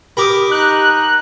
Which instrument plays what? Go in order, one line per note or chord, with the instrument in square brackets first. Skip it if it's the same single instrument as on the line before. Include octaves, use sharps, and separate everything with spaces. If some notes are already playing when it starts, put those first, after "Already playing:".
[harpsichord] G4 A#4 [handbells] B5 D6 D#6
[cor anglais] D#4 [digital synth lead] F#6